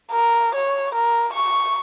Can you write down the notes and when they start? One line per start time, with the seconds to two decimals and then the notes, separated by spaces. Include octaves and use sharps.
0.11 A#4
0.55 C#5
0.95 A#4
1.33 C#6